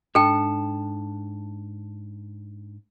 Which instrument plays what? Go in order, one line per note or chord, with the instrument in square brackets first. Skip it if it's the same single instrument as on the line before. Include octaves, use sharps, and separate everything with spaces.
[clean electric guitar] G#2 D4 A5 [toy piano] A4 G5